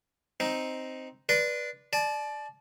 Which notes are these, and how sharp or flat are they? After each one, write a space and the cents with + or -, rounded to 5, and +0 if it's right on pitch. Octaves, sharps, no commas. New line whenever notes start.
C4 +0 D#4 +0
B4 -20 D5 +0 C6 -30
D5 +15 A5 -35